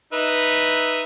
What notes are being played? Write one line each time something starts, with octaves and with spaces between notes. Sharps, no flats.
D#4 B4 E5